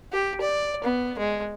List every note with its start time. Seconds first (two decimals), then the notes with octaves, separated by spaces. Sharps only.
0.12 G4
0.41 D5
0.84 B3
1.18 G#3